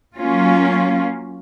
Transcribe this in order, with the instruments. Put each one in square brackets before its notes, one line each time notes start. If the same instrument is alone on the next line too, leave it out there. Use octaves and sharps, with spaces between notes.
[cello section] F#3 A#3 C#4 F4